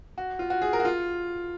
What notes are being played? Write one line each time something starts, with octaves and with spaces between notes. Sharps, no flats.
F#4
F4
F#4
G#4
A#4
F#4
F4